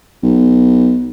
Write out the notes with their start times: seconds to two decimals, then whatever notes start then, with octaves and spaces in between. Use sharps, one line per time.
0.23 B1